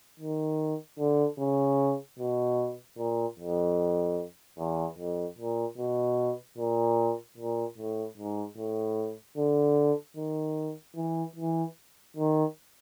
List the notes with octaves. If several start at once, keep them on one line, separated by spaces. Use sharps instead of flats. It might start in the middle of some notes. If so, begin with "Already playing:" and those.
D#3
D3
C#3
B2
A#2
F2
E2
F2
A#2
B2
A#2
A#2
A2
G#2
A2
D3
D#3
E3
E3
D#3